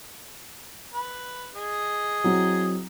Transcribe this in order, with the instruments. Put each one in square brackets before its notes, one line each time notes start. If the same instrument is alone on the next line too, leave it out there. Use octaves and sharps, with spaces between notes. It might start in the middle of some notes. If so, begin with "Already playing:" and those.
[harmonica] B4
G#4 D#5
[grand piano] F#3 C4 E4